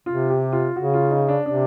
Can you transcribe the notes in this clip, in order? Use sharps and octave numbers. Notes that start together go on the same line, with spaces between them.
C3 F4
G4
F4
C#3 F#4
F4
D#4
D4
C3 D4